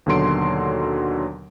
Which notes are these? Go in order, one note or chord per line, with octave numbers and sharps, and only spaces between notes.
D#2 B2 D3 F#3 C6 D7